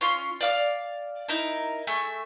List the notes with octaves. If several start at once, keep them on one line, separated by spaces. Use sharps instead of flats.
C#4 F4 C6
D5 F5 D6
D#4 E4 A#4
A3 G#4 E5